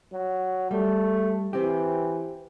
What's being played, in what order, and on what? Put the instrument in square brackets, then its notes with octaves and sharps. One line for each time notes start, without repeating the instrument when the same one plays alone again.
[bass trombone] F#3
[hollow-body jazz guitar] G3 [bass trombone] A3
[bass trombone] E3 [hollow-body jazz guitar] C4 G4